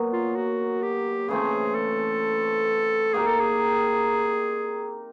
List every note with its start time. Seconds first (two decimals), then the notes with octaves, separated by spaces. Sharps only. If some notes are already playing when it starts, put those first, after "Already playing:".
Already playing: A#2 F#3 B3
0.13 F4
0.36 F#4
0.82 G4
1.28 C#3 E3 A3 C4 G#4
1.75 A4
3.14 A#3 D#4 G4 G#4 A#4
3.27 A4
3.41 G#4